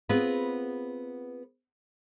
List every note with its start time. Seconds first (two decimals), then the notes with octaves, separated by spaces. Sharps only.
0.09 B3 C4 F4 G#4 B4